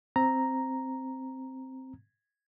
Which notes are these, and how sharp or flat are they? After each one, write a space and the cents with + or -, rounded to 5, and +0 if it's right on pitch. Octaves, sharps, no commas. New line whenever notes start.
C4 +0 A#5 +0